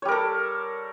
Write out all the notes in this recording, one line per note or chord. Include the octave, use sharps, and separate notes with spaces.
G3 A4 A#4 C#5